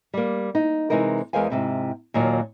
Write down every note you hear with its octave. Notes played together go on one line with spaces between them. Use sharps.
G3 A#3
D#4
C3 E3 G#3 D#4 A#4
E2 G#3 A#4 C5 F5 G#5
G#2 C3 E4
D#2 A#2 F#3